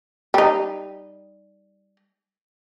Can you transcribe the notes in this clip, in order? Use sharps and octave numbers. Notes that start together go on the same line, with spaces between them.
G3 D#4